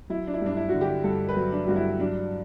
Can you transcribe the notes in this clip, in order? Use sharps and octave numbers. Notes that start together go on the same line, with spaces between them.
F#3 E4
D4
E4
G2 D4
E4
D3 F#4
G4
G2 A4
B4
F#3
D4
G2 F#4
E4
F#3 D4